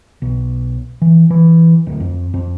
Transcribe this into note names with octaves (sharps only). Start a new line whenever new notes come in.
B1
E3
E3
D1
F2
F2